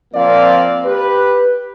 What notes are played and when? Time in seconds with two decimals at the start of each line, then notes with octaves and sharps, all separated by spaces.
0.13 F3 A#3 C4 D5 F5
0.85 G4 B4